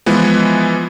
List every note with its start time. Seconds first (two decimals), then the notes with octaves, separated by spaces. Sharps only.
0.06 E3 F3 G#3 B3